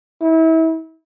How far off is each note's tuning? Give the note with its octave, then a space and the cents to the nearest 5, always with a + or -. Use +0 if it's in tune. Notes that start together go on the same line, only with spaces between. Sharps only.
E4 -35